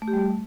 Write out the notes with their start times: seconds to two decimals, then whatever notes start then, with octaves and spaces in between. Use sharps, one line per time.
0.02 A3
0.08 G4
0.13 G3
0.19 A3